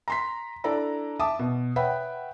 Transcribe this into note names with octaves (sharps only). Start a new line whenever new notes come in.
A#5 C6 B6
D4 E4 A4 D5 A#5
E5 A5 D6 D#6
B2
B4 C#5 E5 F#5 G5 B5